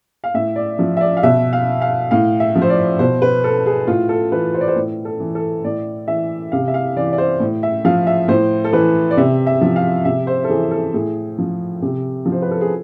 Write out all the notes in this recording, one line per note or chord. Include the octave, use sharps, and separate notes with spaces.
F5
A2 E5
D5
F3
E5
D5
F5
B2 E5
F5
F5
A2 F5
E5
F3
C5
D5
B2 C5
B4
A4
G#4
A2 F4
A4
E3 B4
C5
D5
C5
A2
A4
E3
A4
A2 D5
E3 E5
C3 F5
E5
F5
E3 D5
D5
C5
A2
E5
F3 F5
E5
A2 C5
A4
E3 B4
D5
C3 E5
E5
F3
F5
C3 E5
C5
A4
E3 G#4
A4
A2 G#4
F3
C3
F3
C5
B4
A4
G#4